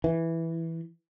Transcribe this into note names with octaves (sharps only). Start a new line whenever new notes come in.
E3